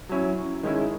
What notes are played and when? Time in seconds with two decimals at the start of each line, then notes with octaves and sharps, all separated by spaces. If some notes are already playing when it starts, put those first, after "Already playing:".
0.09 F#3 C#4 E4
0.63 D#3 G#3 C#4 E4